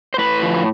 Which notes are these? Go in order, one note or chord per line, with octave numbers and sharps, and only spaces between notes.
C5
A2 B4
F3